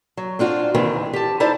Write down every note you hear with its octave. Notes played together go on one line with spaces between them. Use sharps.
F#3
C4 D4 F4 F#4
D#2 C3 D#3 E3 C4
G4 A5
D#4 E4 C5 D5 A5